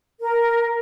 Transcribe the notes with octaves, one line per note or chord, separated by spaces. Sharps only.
A#4